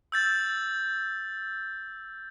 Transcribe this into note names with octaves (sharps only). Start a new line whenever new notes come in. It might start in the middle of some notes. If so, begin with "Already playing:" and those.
E6 G6 A6